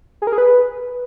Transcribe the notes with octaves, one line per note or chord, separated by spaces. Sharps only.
G#4
A#4
G#4
B4